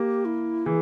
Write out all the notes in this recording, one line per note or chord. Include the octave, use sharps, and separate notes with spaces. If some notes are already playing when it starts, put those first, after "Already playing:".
Already playing: A#3 G4
E4
E3 G#4